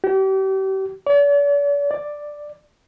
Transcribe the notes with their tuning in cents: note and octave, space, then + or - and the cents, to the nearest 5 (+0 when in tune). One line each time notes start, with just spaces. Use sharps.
G4 -35
D5 -45
D5 +5